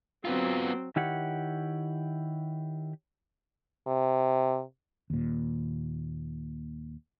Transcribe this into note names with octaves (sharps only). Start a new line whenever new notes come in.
F#3 B3 C4 F4
D#3 E4 G4 C#5 F#5
C3
D#2 A#2